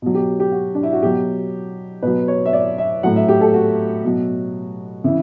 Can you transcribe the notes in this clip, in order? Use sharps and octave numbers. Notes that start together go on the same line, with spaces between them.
B2 F#3
G4
G4
F#4
D4
E4
F#4
B2 F#3 G4
B2 F#3 B4
C#5
E5
D5
E5
A2 F#3 F#5
E5
G4
A4
F#4
B2 F#3
C#3 E3 E4